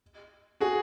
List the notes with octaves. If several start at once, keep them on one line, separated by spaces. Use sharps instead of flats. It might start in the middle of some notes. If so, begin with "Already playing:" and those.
F#4 G#4